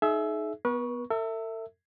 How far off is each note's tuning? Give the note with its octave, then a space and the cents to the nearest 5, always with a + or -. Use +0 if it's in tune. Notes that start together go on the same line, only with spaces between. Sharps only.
D#4 +0 G#4 +40 E5 +5
B3 +0 B4 -40 C#6 +0
A4 +45 E5 +0